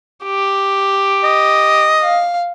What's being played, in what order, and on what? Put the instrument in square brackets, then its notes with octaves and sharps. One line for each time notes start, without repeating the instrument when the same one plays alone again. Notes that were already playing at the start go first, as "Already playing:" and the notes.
[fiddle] G4
[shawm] D#5
[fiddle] F5